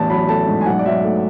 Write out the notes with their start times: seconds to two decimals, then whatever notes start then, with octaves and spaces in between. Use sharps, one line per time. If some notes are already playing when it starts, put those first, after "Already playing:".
Already playing: A1 E2 A5
0.10 F#3 B5
0.29 A3 A5
0.48 G#2
0.61 G#5
0.66 B1 F#5
0.79 D5
0.85 F#3 E5
1.04 A3